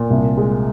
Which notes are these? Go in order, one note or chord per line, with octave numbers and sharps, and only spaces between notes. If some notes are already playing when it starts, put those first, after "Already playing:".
Already playing: A#2
C2
G#3